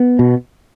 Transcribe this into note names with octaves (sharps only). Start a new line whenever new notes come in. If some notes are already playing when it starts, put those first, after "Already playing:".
Already playing: B3
B2